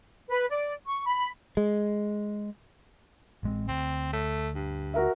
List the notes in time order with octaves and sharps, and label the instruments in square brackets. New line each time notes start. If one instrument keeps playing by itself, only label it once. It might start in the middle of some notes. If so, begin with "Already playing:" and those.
[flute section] B4
D5
C#6
B5
[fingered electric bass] G#3
[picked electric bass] A1 G#3 C4
[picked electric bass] D2 [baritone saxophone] C4
[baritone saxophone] A3
G2
[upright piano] F#4 A#4 E5